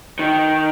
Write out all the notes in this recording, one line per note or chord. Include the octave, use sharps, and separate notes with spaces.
D#3